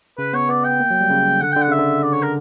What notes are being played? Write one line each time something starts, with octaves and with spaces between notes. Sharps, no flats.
C#3 B4
B3 C#5
B3 D5
G5
A#3
F#3
G3
C#3
D3 F#5
D3 G5
F#5
C#3 E5
D3
D5
C#5
A#4